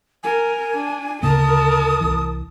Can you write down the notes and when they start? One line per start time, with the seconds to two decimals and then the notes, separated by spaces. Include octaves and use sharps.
0.23 A#4 G#5
0.74 D4
1.23 D2 C#3 A#3 A#4 A5 D#6
2.01 C2 E3